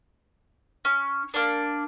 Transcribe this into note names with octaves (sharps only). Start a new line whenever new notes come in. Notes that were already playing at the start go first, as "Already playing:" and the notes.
C#4
A#3 D4